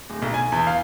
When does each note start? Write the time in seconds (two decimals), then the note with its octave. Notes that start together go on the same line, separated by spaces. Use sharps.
0.10 D1
0.22 B1
0.34 G#5
0.52 E2
0.67 F5